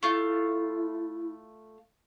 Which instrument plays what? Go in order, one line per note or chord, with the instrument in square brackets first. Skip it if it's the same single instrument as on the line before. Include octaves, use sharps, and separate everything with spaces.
[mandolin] A3 F4 [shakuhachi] E4